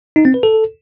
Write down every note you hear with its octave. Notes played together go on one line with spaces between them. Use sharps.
D#4
C4
B4
A4